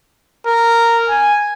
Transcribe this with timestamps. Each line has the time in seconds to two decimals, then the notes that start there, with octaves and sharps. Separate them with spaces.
0.46 A#4
1.09 G#5